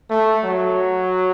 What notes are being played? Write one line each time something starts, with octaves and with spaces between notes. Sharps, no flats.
A3
F#3